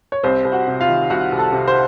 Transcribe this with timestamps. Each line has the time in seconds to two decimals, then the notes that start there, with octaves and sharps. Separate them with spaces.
0.12 C#5
0.23 C2 C4 C5
0.45 C2
0.52 F#4 F#5
0.67 C3
0.81 F4 F5
0.89 D#3
1.10 C2 F#4 F#5
1.32 C2
1.38 A4 A5
1.53 C3
1.67 C5 C6